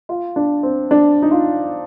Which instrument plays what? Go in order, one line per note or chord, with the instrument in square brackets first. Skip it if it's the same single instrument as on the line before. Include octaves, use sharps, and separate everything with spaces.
[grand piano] F4
D4
C4
D4
D#4
F4